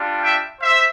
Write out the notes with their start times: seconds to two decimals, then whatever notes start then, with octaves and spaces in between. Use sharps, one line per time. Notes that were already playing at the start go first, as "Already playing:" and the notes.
Already playing: G3 D4 F4
0.23 E5 G5
0.62 C5 E5